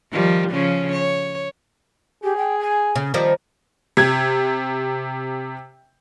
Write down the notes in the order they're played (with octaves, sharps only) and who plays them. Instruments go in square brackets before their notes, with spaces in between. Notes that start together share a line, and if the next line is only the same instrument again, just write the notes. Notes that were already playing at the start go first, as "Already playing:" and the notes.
[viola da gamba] D#3 F3 G3
C#3 F3 C#4
C#5
[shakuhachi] G4 [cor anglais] G#4
[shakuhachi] G5
G#5
[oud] C#3
D#3 F3 G3
[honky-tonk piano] C3 G#6